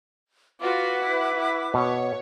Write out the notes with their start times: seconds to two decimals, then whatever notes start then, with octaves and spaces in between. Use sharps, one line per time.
0.61 F4 F#4 B4 F#5 D6
1.00 E4
1.36 E4
1.74 B2 C#5